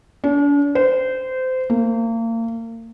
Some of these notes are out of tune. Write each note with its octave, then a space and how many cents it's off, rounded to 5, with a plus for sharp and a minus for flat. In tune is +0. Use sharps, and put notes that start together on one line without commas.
D4 -45
C5 -25
A#3 -35